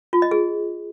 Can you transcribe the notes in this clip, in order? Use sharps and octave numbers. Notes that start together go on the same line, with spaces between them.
F4
D#5
G#4